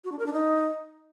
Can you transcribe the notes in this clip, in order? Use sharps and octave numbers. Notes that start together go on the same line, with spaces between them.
F#4
D4
A#4
D4
D#4